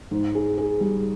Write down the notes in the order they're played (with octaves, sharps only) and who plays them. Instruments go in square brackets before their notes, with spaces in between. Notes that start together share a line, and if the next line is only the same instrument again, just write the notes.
[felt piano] G#2
G#4
G#4
G3